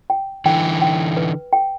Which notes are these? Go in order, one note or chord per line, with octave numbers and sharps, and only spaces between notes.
G5
D3 E3 G5
G5
B4
G5